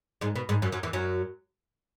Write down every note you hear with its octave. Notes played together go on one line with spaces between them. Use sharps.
G#2 G#3
B2 B3
G#2 G#3
F#2 F#3
F#2 F#3
E2 E3
F#2 F#3